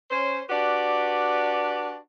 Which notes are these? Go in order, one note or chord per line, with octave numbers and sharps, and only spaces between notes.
C#4 C5
D4 F#4 G4 B4 D5